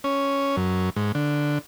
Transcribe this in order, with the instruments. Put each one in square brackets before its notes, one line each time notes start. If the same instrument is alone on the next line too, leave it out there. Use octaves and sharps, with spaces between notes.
[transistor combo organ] C#4
F#2
G#2
D3